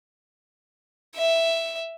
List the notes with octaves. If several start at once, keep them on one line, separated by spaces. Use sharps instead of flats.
E5